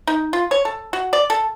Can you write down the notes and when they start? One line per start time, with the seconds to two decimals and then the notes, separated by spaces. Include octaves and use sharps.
0.07 D#4
0.33 F4
0.51 C#5
0.65 A4
0.93 F#4
1.13 D5
1.30 A4